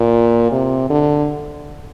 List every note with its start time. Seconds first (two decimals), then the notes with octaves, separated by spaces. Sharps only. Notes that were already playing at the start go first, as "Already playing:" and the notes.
Already playing: A#2
0.52 C3
0.90 D3